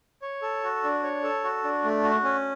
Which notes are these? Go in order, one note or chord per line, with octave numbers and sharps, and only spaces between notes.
C#5
A4
F#4
D4
C#5
A4
F#4
D4
A3
F#4
C#4